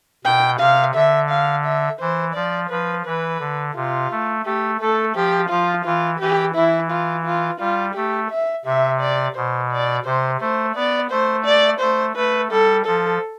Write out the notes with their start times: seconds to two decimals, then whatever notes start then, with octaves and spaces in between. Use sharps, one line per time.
0.25 B2 G5
0.60 C3 F5
0.95 D3 E5
1.31 F5
1.66 E5
2.00 E3 C5
2.35 F3 D5
2.70 F3 B4
3.05 E3 B4
3.40 D3
3.75 C3 F4
4.11 A3
4.46 A3 G4
4.80 A3 A4
5.16 F3 G4
5.50 F3 F4
5.85 E3 F4
6.20 E3 G4
6.56 E3 E4
6.91 F4
7.26 F4
7.60 G3 F4
7.95 A3 G4
8.31 E5
8.65 C3 E5
9.01 D5
9.36 B2 C5
9.72 D5
10.06 C3 C5
10.41 A3 C5
10.76 B3 D5
11.11 A3 C5
11.46 D5
11.81 A3 C5
12.16 A3 B4
12.51 G3 A4
12.86 F3 A4